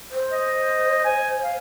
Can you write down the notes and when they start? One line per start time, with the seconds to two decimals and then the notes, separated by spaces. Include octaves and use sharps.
0.12 C5
0.31 D#5
1.05 G#5
1.42 F5